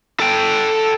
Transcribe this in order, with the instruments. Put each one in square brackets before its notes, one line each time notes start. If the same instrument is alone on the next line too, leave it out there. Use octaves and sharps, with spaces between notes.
[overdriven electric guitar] A4 G5